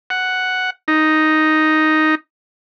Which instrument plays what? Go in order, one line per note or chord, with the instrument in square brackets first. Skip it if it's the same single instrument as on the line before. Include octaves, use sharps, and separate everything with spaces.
[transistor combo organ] F#5
D#4